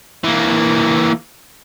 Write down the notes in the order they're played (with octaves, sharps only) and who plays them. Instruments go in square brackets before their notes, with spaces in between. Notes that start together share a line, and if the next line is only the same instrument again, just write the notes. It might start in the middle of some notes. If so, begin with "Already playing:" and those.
[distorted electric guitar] E3 A#3